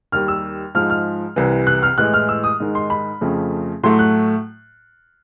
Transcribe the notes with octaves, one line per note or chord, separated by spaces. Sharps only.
D#2 D#3 G3 F6
E6
G#2 F3 G#3 F6
F6
C2 C3 E3
F#6
F6
A2 E3 G#3 F#6
F6
E6
D#6
G#2 D#3 G#3
C6
B5
F2 C#3 F3 A3
A2 F#3 A3 C6
F#6